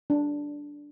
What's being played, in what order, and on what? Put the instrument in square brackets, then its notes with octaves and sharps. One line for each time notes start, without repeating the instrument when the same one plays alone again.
[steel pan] D4